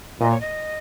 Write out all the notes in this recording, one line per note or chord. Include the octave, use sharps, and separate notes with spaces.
A#2 D#5
C#5
D#5